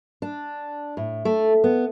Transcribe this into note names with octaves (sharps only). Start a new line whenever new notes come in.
D4
A2
A3
B3